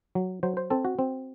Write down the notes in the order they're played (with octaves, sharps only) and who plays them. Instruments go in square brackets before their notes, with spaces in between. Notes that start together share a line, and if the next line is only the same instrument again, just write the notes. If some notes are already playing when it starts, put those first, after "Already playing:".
[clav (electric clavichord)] F#3
F#3 C5
C5
C4 A4
F#4
C4